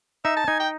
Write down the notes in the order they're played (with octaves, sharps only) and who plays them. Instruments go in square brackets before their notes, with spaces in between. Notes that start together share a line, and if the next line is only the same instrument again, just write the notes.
[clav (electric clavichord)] D#4 [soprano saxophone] E5
[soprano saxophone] A5
[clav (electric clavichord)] D#4 [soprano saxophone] G#5
[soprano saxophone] G5